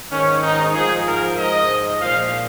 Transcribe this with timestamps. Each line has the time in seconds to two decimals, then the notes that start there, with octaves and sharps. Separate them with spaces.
0.11 G#2 D#3 C#4
0.42 D#4
0.74 G#2 F3 G#4
1.06 A#4
1.38 G#2 F3 D#5
2.01 A#2 F3 F5